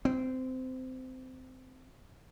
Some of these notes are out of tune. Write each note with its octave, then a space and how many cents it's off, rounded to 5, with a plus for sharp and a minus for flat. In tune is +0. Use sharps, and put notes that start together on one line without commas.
C4 -20